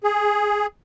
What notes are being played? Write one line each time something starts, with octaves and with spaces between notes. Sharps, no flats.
G#4